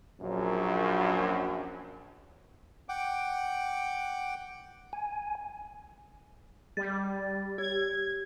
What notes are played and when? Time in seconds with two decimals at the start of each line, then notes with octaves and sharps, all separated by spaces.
0.21 A#1 F#2
2.89 F#5 G5 D6
4.93 G#5
6.77 G3 A6
7.58 G4 G#6